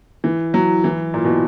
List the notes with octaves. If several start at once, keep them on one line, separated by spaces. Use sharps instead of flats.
E3
F#3
E3
A#2
B2